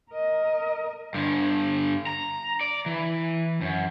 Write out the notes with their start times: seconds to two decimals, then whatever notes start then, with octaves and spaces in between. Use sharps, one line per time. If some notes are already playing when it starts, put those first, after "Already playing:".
0.12 A#4 D#5
1.14 G2 D3
2.07 A#5
2.61 D5
2.86 E3
3.61 F#2